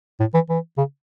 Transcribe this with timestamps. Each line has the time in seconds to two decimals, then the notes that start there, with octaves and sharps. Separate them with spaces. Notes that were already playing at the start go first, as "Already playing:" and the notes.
0.20 A2
0.34 E3
0.50 E3
0.78 C#3